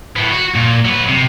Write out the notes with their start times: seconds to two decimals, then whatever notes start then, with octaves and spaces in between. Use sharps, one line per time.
0.16 A2 B3
0.32 F#4
0.56 A#2
0.85 F#3 B4
1.08 C3